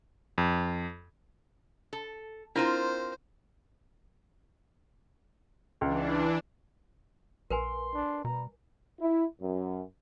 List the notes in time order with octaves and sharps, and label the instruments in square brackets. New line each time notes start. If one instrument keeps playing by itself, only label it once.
[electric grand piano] F2
[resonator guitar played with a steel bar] A4
[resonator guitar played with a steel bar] C4 F4 A#4 [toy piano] D4 E4 [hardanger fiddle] C5
[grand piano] C#2 [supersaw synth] E3 D4
[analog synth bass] A#1 [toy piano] A#4 B4 G#5 [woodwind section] C6
[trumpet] D4
[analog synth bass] B2 [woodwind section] E3 G3 [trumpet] A#5
[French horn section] E4
F#2